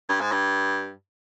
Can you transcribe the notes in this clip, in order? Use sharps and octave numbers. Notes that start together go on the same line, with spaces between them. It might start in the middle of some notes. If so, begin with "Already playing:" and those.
G2
G#2
G2